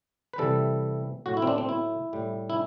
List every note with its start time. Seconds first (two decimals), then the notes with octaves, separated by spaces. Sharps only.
0.33 B4
0.38 C3 E3 G3 A4
1.26 A2 F#3 F#4
1.37 E4
1.42 C4
1.47 D4
1.58 C4
1.69 E4
2.13 A2 G3
2.50 E4